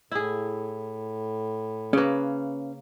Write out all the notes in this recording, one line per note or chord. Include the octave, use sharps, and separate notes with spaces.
A2 E4 G#4
C#3 A#3 C#4 B4